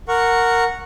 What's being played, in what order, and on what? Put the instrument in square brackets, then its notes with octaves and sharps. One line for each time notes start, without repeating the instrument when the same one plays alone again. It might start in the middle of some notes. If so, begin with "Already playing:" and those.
[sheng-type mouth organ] A#4 F#5 C#6